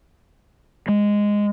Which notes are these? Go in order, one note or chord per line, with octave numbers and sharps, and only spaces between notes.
G#3